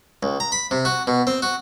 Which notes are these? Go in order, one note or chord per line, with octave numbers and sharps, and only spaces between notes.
C#2
A#5
B5
C3
F#4
B2
C4
F#4